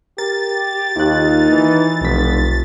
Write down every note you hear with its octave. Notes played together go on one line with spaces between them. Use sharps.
G4 A#4 A6
D#2 D#4 F4 F#6
E3
F1 B1 B6